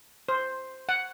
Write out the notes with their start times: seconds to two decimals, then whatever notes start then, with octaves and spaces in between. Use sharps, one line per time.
0.29 C5
0.89 F#5